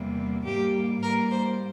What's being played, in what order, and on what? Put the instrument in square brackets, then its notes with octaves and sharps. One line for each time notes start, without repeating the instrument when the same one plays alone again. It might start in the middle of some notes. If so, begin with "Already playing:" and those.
Already playing: [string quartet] E2 C3 G3 A#3
G#2 G3 A#3 G4
G#2 G3 A#3 A#4
C5